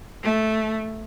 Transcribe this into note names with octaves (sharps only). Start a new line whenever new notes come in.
A3